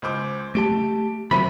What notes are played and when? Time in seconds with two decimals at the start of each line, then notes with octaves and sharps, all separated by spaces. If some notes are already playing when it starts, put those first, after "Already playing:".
0.02 C#2 C5 D6
0.55 A3 G4 A5 D7
1.31 C3 D#3 F3 F#3 B5